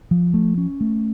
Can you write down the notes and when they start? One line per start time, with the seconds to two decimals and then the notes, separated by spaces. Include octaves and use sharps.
0.11 F3
0.34 A3
0.58 C#4
0.81 A3